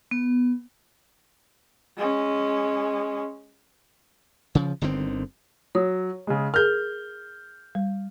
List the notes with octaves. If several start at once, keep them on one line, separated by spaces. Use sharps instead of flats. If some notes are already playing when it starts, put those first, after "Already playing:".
B3
G#3 C#4
C#3 F3
G1 D3 D#3 C4
F#3 C#5 D#6
C#3 G#3
G#4 A#4 F6 G6
G3